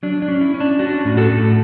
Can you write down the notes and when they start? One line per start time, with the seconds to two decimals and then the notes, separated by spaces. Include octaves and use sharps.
0.03 F#3 D4
0.22 D4
0.28 C#4
0.41 E4
0.54 C#4
0.60 D4
0.79 C#4 D4 F#4
1.05 A2
1.17 F#4 A4
1.31 A2